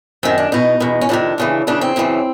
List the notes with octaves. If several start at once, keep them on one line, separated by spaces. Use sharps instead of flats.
F#2 D#3 C4
D4
E2 B2 D#4
E2 B2
C#4
F2 C3 D#3 D4
D#2 C#3 E3
D2 C#3 E3 D4
C4
F#2 C#3 E3